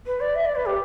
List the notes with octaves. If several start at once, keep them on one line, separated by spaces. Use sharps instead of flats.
B4
D5
E5
D5
B4
G4